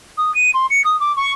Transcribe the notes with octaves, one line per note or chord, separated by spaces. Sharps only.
D#6
D#7
C6
C#7
D#6
D6
C#6